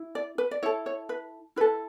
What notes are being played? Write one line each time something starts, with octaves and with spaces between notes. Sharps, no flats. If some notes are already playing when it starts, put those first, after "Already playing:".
Already playing: E4
D5
B4
D5
E4 A4 C#5
C#5
B4
E4 A4 B4